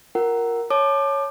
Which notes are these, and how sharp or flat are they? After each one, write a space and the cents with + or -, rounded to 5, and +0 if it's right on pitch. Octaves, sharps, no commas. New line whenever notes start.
F4 +0 A#4 +0 F#5 +25
C#5 +0 A5 -15 D6 +25